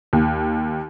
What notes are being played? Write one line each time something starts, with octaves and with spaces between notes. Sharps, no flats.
D#2